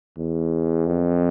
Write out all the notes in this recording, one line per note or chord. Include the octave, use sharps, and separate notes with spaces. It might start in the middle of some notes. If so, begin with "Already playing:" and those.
E2
F2